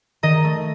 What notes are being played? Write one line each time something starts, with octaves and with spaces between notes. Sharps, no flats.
D#3 D#5
A3